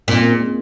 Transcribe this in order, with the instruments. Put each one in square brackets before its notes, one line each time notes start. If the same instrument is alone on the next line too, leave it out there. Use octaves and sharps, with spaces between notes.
[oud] A#2 [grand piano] C4 D#4
[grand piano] A#3 C#4
G#3 C4